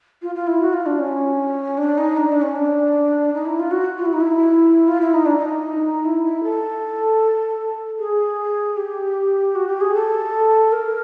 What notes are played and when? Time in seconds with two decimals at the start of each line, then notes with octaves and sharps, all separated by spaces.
0.22 F4
0.35 F4
0.47 E4
0.61 F#4
0.73 F4
0.86 D4
0.99 C#4
1.78 D4
1.97 D#4
2.17 D4
2.29 D4
2.42 C#4
2.56 D4
3.33 D#4
3.45 E4
3.59 F4
3.71 F#4
3.98 F4
4.06 E4
4.13 D#4
4.20 E4
4.88 F4
5.01 E4
5.14 D#4
5.26 D4
5.38 D#4
6.05 E4
6.24 E4
6.43 A4
7.99 G#4
8.77 G4
9.55 F#4
9.68 G4
9.81 G#4
9.95 A4
10.72 A#4